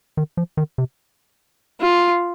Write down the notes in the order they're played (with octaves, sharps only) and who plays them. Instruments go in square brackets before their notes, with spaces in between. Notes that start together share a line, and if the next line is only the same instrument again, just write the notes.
[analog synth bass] D#3
F3
D#3
C3
[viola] F4